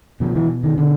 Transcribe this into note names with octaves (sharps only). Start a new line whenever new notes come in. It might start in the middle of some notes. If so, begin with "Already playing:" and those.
B2 F3
E3
D#3
D3